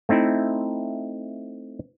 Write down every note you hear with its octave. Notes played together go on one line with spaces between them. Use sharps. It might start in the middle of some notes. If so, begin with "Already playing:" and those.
A3 C4 D#4 E4